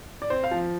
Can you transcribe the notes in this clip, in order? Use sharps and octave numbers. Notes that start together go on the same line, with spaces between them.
D5
C4 C5
F5
F3